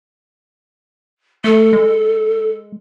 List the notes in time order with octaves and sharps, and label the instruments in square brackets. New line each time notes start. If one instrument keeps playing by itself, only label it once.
[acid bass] A3 [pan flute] A4
[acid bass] G#3